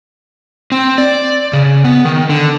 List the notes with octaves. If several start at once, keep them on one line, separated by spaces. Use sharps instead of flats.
C4
D5
C#3
B3
D#3
D3